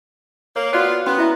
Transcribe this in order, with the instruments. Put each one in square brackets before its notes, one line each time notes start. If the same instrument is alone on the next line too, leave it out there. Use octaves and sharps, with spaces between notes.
[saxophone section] A#3 [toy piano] C#5
[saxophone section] B3 F4 [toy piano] F#4 D5 F#5
[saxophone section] B3 [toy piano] C#4 C6
[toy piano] E4 E5 A#5